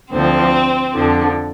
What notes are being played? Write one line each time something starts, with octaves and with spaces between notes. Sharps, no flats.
D2 D3 F3 C4
F2 D3 F3